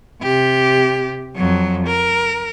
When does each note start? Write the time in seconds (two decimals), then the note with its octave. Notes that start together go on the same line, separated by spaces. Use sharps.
0.23 C3 G4
1.36 F2 F#3
1.87 A#4